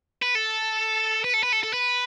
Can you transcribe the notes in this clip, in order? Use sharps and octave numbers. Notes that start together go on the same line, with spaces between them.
B4
A4
B4
A4
B4
A4
A4
B4